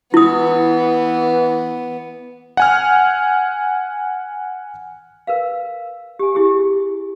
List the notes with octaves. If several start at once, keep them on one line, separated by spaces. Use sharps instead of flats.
E3 B3 E4 D#6
F#5 G#5 F6
A#4 B4 F5
G4 G#5
E4 G4 G#4